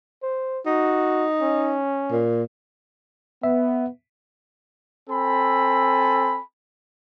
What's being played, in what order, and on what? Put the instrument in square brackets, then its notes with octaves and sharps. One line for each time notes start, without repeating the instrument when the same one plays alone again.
[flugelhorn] C5
[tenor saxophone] D#4 [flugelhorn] F#4
[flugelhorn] C#4
[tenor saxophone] A#2
[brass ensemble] B3 [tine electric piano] E5
[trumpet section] C4 A4 G#5 B5